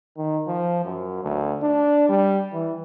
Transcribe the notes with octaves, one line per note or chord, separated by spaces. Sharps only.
D#3
F3
F#2
D2
D4
G3
E3